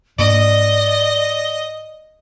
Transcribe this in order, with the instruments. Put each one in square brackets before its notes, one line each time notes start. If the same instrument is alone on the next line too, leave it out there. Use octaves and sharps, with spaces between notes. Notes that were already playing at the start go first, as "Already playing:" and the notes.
[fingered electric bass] G#2 A#3 D4 [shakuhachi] D5 [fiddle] D#5